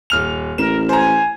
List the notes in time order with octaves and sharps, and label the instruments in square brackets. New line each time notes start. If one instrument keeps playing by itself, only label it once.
[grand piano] D#1 F6 F7
[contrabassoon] A1 [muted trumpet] A#4 [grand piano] E7
[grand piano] C5 A#5 [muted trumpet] G#5